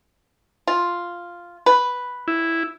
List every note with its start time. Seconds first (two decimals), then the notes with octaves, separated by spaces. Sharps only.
0.67 F4
1.66 B4
2.28 E4